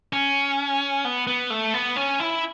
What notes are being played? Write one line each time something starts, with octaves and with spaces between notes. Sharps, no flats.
C#4
B3
B3
A3
B3
C#4
E4